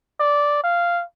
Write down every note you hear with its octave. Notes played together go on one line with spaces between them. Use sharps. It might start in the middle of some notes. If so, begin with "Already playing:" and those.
D5
F5